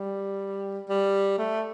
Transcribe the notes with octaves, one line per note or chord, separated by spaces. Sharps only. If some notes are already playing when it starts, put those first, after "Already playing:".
Already playing: G3
G3
A3